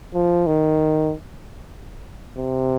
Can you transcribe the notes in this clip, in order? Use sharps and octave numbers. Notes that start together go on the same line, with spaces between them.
F3
D#3
C3